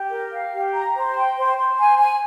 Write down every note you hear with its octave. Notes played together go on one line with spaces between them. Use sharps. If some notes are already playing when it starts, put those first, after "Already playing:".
Already playing: G4
A#4
F5
G4
A#5
C5
G5
C5
C5
G#5
G#5